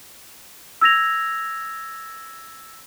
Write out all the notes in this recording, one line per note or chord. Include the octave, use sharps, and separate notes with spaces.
E6 G#6 A#6 F7